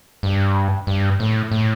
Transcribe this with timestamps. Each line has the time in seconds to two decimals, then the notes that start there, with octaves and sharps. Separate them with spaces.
0.23 G2
0.87 G2
1.20 A2
1.51 A2